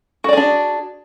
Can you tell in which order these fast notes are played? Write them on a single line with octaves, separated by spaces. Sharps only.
F#4 D5 G#4 D4